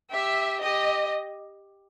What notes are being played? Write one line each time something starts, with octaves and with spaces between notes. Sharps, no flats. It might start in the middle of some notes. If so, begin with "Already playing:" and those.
G4 E5
G4 D#5